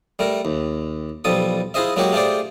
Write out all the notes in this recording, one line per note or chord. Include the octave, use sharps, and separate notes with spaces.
G3 A3 A#4
D#2
B1 F3 G3 A4 D#6
E4 F4 G#4 C5 D#5 E5
F#3 G#3 A#3 F#4 G4 C#5
A3 F4 G4 G#4 C5 D5